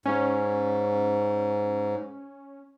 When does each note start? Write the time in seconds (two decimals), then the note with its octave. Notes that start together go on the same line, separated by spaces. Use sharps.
0.06 G#2 C#4